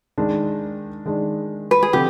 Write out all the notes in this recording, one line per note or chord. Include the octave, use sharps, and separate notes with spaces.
D#3 G#3 D4
D#3 G#3 D4
B4
G#4
D3 F3 C4 G4